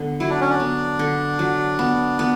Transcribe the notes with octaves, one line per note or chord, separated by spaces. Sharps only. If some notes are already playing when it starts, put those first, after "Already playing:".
Already playing: D3 B3
F#3 E4
D4
C#4
D4
B3
D3
F#3
B3
B3